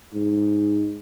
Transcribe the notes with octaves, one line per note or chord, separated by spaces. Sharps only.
G#2